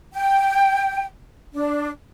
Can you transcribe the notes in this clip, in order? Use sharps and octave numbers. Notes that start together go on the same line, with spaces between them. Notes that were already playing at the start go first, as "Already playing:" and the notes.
G5
D4